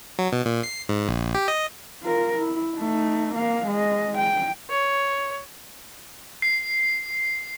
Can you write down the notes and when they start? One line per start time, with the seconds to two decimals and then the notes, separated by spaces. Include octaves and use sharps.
0.19 F#3
0.33 B2
0.46 A#2
0.63 C7
0.89 G#2
1.09 A#1
1.35 G4
1.48 D#5
2.02 F4 A#4
2.38 E4
2.77 A3 D#4
3.35 A#3 F5
3.67 G#3 D#5
4.18 G5
4.70 C#5
6.42 C7